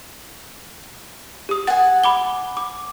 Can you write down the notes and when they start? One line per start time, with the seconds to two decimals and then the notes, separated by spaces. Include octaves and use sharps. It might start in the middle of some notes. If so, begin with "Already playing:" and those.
1.49 G4 D#6
1.67 F#5 G#5 A6
2.04 B5 D6 G7
2.57 D6